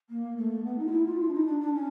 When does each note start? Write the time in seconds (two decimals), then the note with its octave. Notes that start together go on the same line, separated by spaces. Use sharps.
0.09 A#3
0.36 A3
0.63 B3
0.78 D#4
0.86 F4
0.91 E4
1.06 F4
1.19 E4
1.28 D4
1.33 D#4
1.46 D4
1.60 D4
1.73 C#4